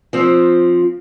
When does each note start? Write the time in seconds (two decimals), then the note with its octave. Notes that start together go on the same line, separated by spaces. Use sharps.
0.13 F3 C4